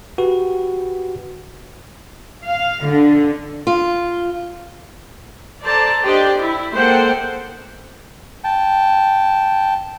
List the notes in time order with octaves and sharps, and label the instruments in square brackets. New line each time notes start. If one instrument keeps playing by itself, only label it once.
[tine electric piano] F#4 G4 B4
[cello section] F5
D3
[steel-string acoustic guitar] F4
[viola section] A4 C5 D5 A5 A#5
D4 G4 C5 D5 D#5 G5
E4
G#3 A#3 A4 C5 F#5 G5
[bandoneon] G5 A5